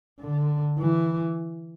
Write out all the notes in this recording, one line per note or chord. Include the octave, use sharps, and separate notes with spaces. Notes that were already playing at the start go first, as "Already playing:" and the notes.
D3
E3